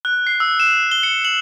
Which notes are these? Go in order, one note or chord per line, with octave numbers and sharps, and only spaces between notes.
F#6
C7
E6
E7
G7
C#7
F#7